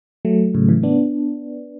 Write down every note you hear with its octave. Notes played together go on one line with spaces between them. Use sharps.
F#3 A3
A2 C#3
C#3 E3
B3 D4